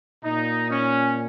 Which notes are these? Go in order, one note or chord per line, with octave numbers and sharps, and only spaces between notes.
A#2 D#4
C#4